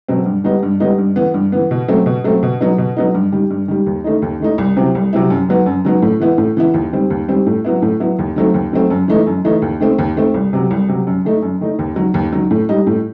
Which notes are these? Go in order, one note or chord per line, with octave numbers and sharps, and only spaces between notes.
B2 F#3 C4
G2
D#3 G3 B3 D#4
G2
D#3 G3 B3 D#4
G2
E3 B3
G2
E3 B3
B2
F#3 A3 C4
B2
F#3 A3 C4
B2
F#3 B3 D#4
B2
F#3 B3 D#4
G2
D#3 G3
G2
D#3 G3
D#2
D#3 A3 D#4
D#2
D#3 A3 D#4
C2
C3 F#3 C4 E4
C2
C3 F#3 C4 E4
F#2
D#3 F#3 B3
F#2
D#3 F#3 B3
A2
E3 B3 E4
A2
E3 B3 E4
D#2
D#3 G3 C4
D#2
D#3 G3 C4
A2
F#3 B3 E4
A2
F#3 B3 E4
D#2
D#3 F#3 A3 C4
D#2
D#3 F#3 A3 C4
F#2
E3 A3 D#4
F#2
E3 A3 D#4
D#2
D#3 A3 C4
D#2
D#3 A3 C4
C2
C3 F#3
C2
C3 F#3
F#2
D#3 A3 D#4
F#2
D#3 A3 D#4
D#2
D#3 F#3
D#2
D#3 F#3
A2
G3 D#4
A2